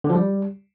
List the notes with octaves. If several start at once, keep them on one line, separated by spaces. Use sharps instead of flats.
D3
F3
G3